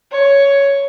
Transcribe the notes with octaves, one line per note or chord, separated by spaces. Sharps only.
C#5